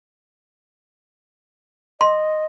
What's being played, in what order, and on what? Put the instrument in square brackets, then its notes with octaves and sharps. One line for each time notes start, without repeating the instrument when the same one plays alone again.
[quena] D#5 [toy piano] C6